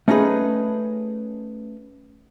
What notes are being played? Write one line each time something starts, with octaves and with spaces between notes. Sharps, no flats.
A3 C#4 D#4 F#4 G#4 B4